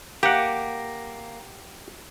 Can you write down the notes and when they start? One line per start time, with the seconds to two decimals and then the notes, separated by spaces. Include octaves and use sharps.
0.23 A#3 G4 F#5